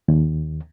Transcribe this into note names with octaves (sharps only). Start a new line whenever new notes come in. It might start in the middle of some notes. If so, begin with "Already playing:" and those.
D#2